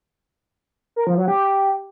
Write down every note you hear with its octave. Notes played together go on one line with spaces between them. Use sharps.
A#4
F3
F#3
G4